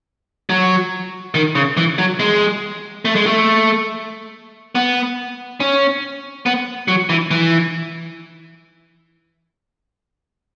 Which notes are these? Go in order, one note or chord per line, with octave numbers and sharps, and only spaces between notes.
F#3
D#3
C#3
E3
F#3
G#3
A3
G#3
A3
B3
C#4
B3
F#3
E3
E3